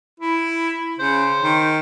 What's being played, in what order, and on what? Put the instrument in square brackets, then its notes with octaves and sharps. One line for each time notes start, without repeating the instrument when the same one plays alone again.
[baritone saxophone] E4
[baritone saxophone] C#3 [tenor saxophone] C5
[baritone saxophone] D#3